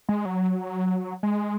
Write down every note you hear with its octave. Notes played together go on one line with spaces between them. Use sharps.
G#3
F#3
G#3